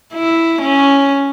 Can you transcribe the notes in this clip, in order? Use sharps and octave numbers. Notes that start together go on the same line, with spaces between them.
E4
C#4